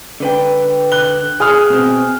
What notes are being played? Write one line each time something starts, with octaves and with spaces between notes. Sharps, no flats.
D3 B4 G5
F#6 G7
G#4 D#6 F6
B2 C4